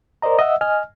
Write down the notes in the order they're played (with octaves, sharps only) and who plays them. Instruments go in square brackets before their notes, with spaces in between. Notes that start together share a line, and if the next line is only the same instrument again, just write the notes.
[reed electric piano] A#4 C5 D5 D#5 A#5
D#5 E5 F#5 E6
D#5 G#5 F6